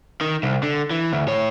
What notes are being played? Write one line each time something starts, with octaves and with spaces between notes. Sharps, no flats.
D#3
C2
D3
E3
D2
A2 C#5